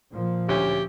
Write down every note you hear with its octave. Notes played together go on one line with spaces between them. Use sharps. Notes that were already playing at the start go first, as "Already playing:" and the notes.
A#2 F3
D2 C#4 G4